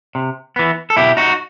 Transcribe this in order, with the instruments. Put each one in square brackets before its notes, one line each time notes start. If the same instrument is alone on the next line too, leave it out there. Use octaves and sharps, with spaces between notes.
[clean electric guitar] C3
E3 B3
A4
B2 E4 G4
D#4 F#4